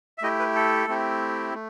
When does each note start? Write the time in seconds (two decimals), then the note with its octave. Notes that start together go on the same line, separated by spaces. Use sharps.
0.18 E5
0.22 A3 E4 G4 D#5
0.39 B4
0.55 A4
0.88 A3 C4 E4 G4
1.54 A3